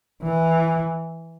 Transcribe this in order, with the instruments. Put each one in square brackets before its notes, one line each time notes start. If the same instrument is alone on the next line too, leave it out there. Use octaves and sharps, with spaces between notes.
[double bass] E3